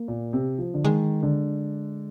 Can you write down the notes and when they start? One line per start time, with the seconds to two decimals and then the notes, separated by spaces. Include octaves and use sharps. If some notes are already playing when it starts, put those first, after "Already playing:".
Already playing: A#3
0.08 A#2
0.33 C3
0.58 F3
0.74 D3
0.85 D#3 G#3
1.23 D3